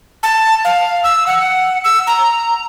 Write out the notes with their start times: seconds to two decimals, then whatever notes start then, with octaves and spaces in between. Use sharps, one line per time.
0.23 A5
0.65 F5
1.04 E6
1.27 F#5
1.84 E6
2.07 A#5